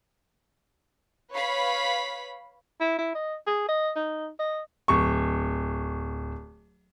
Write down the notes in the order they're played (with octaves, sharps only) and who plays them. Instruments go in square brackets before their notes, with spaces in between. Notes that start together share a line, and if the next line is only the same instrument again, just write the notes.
[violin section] B4 C#5 F5 B5
[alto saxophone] E4
E4
D#5
G#4
D#5
D#4
D#5
[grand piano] D1 C#6